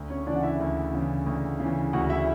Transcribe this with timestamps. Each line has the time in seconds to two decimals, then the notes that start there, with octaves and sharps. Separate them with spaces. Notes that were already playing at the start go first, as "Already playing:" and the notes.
Already playing: D2
0.10 C#4 C#5
0.27 C#3 E3 D4 D5
0.36 F#5
0.43 E4 E5
0.60 D2
0.94 C#3 E3
1.26 D2
1.60 C#3 E3
1.93 D2 F#4 F#5
2.09 E4 E5